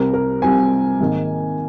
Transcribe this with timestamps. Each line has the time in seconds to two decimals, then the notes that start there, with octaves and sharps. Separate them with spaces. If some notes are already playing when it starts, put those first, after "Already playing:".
Already playing: C2 C3 G3 C4 A#4
0.14 A#4
0.42 C2 C3 G3 C4 G#5
1.00 G#1 G#2 D#3 A#3